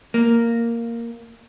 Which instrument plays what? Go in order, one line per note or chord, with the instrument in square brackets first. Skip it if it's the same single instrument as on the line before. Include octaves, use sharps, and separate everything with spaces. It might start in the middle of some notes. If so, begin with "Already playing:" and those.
[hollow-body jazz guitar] A#3